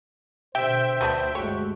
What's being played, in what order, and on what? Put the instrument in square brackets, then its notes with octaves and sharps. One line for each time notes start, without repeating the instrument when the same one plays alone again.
[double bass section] B2 D3 [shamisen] G4 [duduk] C5 [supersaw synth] E5 G5
[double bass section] D2 [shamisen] F#3 B3 D4
[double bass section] G1 G#3 A3 [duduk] F#4 [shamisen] C#5